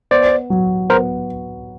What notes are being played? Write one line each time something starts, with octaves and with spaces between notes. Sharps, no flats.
B3 C5 D5
F#3
B3 A#4 C5